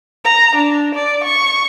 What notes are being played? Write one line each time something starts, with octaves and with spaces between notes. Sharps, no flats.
A#5
D4
D5
C#6